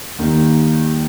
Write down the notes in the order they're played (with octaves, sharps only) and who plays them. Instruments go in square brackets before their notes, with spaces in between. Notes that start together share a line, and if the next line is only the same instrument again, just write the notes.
[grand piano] D#2 D#3 G3 A#3